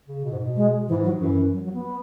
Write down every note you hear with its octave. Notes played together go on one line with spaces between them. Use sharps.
C#3
B2
G#2
B2
G#3
G#2 E3
F#3
F#2 E3
F#3
F#3
B3